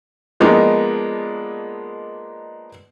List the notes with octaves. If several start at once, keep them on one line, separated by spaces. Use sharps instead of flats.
F3 G#3 A#3 B3 D4 D#4